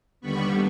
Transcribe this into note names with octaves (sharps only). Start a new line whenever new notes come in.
D#2 D3 G3 B3 B5 C#6